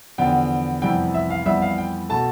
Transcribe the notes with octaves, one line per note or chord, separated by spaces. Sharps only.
E2 D3 F3 B3 G5
F2 C3 E3 G3 B3 G5
E5
F5
F2 E3 G3 B3 E5
F5
G5
B2 A3 A5